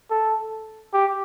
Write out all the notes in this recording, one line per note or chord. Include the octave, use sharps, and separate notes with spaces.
A4
G4